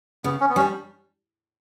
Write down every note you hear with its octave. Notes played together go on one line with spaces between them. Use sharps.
C#3 B3
C#4
B3
G3 C#4 D4